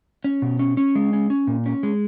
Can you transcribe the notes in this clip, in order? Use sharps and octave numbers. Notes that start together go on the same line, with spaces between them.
C#4
B2
C#4
C#4
G#3
C#4
C#4
A#2
C#4
G#3